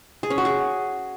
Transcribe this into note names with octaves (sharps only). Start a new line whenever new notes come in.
G#4
C#4
F#4
G#4